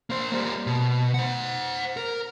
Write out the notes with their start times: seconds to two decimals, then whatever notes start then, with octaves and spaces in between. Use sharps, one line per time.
0.10 A#3 C5
0.32 G3 A#3
0.67 B2
1.14 C5 F#5
1.97 A#4